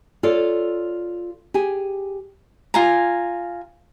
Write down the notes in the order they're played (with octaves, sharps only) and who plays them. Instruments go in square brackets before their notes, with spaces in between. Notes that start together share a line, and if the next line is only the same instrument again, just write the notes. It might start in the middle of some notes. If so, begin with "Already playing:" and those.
[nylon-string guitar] F4 A4 C#5 D5
G4 G#4 G#5
[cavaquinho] F4 G#5 A#5